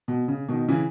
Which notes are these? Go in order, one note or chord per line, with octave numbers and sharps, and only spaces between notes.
B2
C#3
B2 D#3
C#3 E3